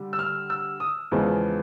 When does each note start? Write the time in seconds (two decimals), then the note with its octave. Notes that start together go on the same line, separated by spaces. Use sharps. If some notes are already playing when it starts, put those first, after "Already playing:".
Already playing: D3 G3
0.13 E6
0.19 F6
0.50 E6
0.80 D#6
1.12 E2 C#3 F3 G#3 B3